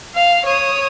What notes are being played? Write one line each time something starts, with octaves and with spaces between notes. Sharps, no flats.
F5
C#5 D#6